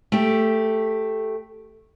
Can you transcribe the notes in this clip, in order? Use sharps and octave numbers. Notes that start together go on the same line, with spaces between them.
A3 G4